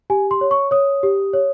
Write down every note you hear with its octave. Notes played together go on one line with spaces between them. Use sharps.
G4 G#5
C6
C#5
C#6
C#5 D#6
G4
C#5